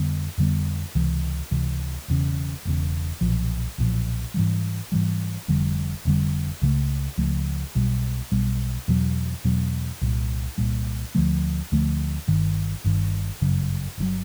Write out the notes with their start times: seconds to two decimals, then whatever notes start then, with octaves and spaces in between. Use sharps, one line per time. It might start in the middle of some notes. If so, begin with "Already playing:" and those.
Already playing: F2 D3 G3 B3
0.38 F2 D3 G3 B3
0.95 C#2 C3 E3
1.51 C#2 C3 E3
2.08 E1 E2 C#3
2.65 E1 E2 C#3
3.21 B1 A#2 F3
3.78 B1 A#2 F3
4.34 G#2 E3 G3
4.92 G#2 E3 G3
5.48 F1 F2 D3 G3
6.05 F1 F2 D3 G3
6.62 C#2 C#3 F3 A3
7.18 C#2 C#3 F3 A3
7.75 B1 B2 G3
8.32 B1 B2 G3
8.88 E2 B2 F#3
9.44 E2 B2 F#3
10.01 C2 A#2 G3
10.58 C2 A#2 G3
11.15 D2 D3 F3 A3
11.72 D2 D3 F3 A3
12.28 G1 G2 D#3
12.84 G1 G2 D#3
13.41 G1 F#2 C#3 F#3
13.98 G1 C#3 F#3